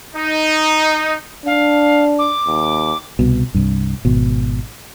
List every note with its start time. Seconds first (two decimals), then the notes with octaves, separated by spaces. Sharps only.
0.15 D#4
1.46 D4 F5
2.18 D6
2.47 D#2
3.19 C2 B2
3.54 C2 G2
4.05 G#1 B2